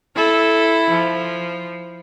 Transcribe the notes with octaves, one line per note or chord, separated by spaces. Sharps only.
E4 A4
F3